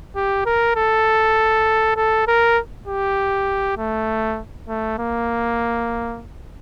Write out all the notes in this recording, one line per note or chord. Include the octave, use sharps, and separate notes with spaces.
G4
A#4
A4
A4
A#4
G4
A3
A3
A#3